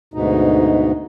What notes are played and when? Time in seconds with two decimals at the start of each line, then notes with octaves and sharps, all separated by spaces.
0.14 D2 G#2 B2 D#4